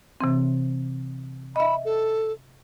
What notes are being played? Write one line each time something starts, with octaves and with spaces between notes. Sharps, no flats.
C3 E3 C4
D#5 E5 B5
A4